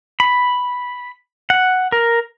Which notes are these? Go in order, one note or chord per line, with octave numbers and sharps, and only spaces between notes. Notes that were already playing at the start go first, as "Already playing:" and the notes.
B5
F#5
A#4